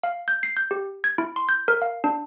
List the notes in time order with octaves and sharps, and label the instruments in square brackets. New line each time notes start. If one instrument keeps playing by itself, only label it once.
[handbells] F5
G6
C7
G6
G4
G#6
E4
C6
G6
A#4
F5
D4